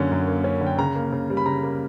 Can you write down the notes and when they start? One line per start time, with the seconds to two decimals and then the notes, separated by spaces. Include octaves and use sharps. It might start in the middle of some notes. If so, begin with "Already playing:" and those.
Already playing: F#2 D3 A#3 C#4
0.11 F#2
0.28 A#3
0.44 C#4
0.61 D3
0.66 G5
0.78 C#3 A#5
0.95 A#3
1.13 C#3
1.30 G3
1.37 B5
1.46 C#3 A#5
1.63 A#3